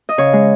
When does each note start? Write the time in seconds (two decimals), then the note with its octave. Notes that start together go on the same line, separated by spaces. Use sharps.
0.09 D#5
0.18 C#3 C#5
0.33 G#3